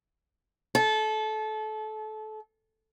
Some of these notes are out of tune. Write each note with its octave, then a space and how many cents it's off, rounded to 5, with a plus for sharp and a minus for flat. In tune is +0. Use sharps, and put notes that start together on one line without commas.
A4 -25